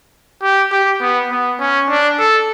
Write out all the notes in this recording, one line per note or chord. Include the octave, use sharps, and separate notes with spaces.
G4
G4
B3
B3
C#4
D4
A4